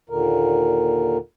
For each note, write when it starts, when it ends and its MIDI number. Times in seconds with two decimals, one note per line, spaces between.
0.10 1.18 39
0.10 1.18 46
0.10 1.18 50
0.10 1.18 70